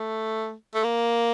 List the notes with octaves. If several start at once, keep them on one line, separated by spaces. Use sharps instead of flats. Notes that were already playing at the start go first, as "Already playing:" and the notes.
Already playing: A3
A3
A#3